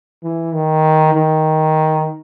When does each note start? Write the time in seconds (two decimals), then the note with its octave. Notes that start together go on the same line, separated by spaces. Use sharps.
0.23 E3
0.53 D#3
1.14 D#3